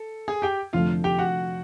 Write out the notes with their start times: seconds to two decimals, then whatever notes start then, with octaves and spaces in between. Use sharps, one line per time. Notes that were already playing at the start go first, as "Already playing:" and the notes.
Already playing: A4
0.28 G#4 G#5
0.42 G4 G5
0.73 F1 F2 D3 F3 A3 F4 F5
1.04 G4 G5
1.18 F#4 F#5